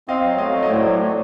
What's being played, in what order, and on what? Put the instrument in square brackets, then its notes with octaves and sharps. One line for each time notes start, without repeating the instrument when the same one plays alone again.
[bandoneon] C4 [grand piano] D#5 F5
[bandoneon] F#3
[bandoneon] A3 [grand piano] D#5 F5
[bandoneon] F#3
[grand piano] D#5
[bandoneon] A2 [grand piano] C5 D5
[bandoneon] F#3
A3